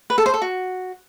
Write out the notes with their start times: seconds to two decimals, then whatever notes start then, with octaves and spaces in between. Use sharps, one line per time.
0.10 B4
0.18 A4
0.26 C5
0.34 A4
0.42 F#4